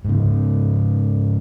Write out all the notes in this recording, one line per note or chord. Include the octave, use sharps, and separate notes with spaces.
G#2 C#3